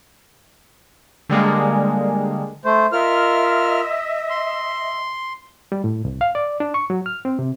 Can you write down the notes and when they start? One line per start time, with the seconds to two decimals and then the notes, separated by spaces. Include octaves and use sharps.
1.30 D3 G3 G#3 A#3
2.64 A3 C5
2.92 F4 A#4 D#5 E5 F6
4.30 C6
5.72 G3
5.84 A2
6.05 C2
6.21 F5
6.35 D5
6.60 D4
6.74 C#6
6.90 F#3
7.06 F6
7.25 C4
7.39 C3